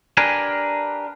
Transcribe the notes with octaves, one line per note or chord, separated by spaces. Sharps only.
D4 G4 A#4 B4 G#5